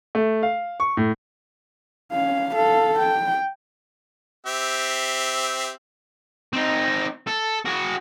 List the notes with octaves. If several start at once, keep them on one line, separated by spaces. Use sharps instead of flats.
A3
F5
C#6
A2
C#4 F5
A4 F5
G5
C4 G4 E5
C4 D#4
A4
F#4 G#4